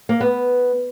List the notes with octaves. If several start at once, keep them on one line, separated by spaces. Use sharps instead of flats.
A#3
B3